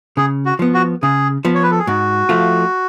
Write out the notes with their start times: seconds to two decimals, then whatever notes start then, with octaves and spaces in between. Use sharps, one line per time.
0.17 C#3 G#4
0.46 F#4
0.59 F3 B3
0.74 F#4
1.02 C#3 G#4
1.45 F3 B3
1.55 C#5
1.63 B4
1.71 A4
1.79 G#4
1.87 G#2 F#4
2.29 F3 A3 F4